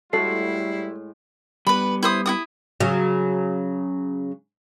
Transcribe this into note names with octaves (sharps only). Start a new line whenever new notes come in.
A2 G3 G#3 E4 F#4 A4 C7
G3 B3 B4 B5
E4 C5 D#6
E4 F#4 D#6
C#3 F#3